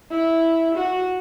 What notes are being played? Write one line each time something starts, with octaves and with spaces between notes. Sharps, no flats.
E4
F#4